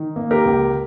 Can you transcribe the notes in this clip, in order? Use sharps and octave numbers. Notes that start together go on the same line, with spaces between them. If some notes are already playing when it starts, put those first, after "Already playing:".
Already playing: D#3
A#3
G4 A#4
C#2